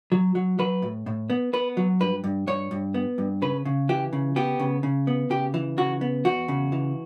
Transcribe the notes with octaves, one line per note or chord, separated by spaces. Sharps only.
F#3
F#3
F#3 B4
A2
A2
B3
B3 B4
F#3
G2 B4
G2
G2 C#5
G2
B3
G2
C#3 B4
C#3
E3 G4
C#3
B3 G4
C#3
C#3
B3
C#3 G4
E3
C#3 F#4
B3
E2 F#4
C#3
E3